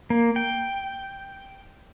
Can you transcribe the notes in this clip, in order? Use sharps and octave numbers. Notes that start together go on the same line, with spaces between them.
A#3
G5